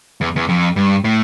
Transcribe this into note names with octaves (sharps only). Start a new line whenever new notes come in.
E2
E2
F2
G2
A2